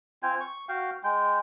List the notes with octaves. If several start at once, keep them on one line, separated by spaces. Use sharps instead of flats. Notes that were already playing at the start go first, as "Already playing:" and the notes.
C4 F4 G5 G#5
C#6
F#4 F5 G5
G#3 G5